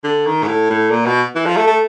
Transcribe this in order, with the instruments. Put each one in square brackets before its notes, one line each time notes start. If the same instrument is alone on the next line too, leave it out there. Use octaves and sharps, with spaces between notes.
[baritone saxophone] D3
D#3
G#2
A2
A2
A#2
B2
E3
F3
A3
A3